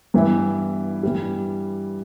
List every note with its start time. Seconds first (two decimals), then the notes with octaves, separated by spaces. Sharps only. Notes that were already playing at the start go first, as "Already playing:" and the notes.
0.14 G2 E3 B3 E4
1.03 G2 E3 G3